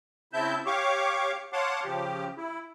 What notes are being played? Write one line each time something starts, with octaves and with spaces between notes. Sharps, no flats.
C#3 C4 E4 E5 A5 G6
G4 C#5 F5 C#6 D6
C#5 F5 F#5 A5 C6 D6
C#3 F3 G4
E4